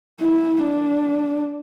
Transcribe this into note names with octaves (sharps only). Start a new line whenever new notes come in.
E4
D4